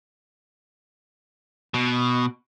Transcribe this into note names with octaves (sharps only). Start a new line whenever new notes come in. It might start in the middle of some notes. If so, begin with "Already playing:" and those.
B2